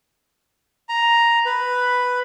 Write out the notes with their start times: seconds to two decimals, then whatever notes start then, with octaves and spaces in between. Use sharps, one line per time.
0.89 A#5
1.46 B4